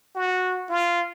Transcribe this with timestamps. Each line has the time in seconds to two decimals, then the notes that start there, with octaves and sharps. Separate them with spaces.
0.15 F#4
0.69 F4